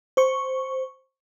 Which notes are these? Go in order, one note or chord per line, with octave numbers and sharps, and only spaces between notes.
C5 C#6